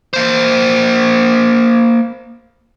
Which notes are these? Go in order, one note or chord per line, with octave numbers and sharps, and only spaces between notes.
A#3 C5